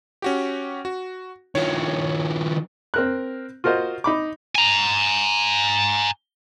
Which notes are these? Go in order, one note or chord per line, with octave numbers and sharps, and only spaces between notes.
C#4 F#4 G4
F#4
D#3 F3 C#5
C4 A#4 F#6
F4 F#4 A#4 C5 D#5
D#4 B5 D6
G#5 A#5